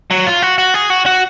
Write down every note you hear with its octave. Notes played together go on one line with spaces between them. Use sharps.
F#3
F4
F#4
F#4
G#4
F#4
F#4